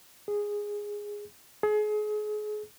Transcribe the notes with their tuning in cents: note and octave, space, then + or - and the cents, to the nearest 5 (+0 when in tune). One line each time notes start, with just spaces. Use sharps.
G#4 -10
G#4 +30